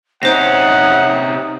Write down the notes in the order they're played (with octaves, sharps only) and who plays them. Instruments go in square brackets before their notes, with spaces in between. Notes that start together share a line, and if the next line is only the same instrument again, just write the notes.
[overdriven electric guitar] C3 C#4 [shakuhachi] D#4 [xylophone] C5 A#6 [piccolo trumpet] F#5